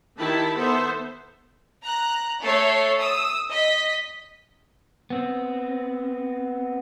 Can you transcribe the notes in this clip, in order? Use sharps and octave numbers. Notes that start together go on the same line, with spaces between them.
D#3 E4 G4 A5 B5
B3 A4 C5 E5
A#5 F#6
A3 A4 C#5 C7
D#6 E6
D#5 B6
B3 C4